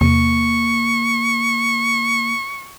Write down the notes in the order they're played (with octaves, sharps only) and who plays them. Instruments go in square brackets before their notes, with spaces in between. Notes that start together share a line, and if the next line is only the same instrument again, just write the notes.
[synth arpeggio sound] E2 C3 [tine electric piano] A#3 [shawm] C#6